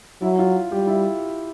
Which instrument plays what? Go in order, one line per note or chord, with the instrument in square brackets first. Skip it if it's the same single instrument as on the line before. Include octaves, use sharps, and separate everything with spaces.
[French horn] F#3 [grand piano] E4
[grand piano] F4
[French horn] G3 [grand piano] G4
[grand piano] E4